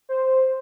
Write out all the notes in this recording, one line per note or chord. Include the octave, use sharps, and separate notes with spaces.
C5